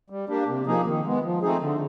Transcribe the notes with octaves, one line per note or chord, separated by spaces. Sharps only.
G3
A#3 D4 G4
C3
F3 A#3 D#4 G#4
D#3
G#3 B3
F3
A3 C4 D#4 G#4
D3